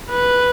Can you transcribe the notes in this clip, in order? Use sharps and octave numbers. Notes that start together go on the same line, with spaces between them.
B4